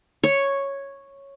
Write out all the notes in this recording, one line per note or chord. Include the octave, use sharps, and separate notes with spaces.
C#5